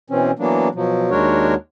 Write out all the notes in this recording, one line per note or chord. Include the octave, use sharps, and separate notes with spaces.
B2 E3 C4 C#4
E3 F#3 A#3 B3 D4
B2 F3 F#3
D#2 G#3 D4 F#4 A#4 C#5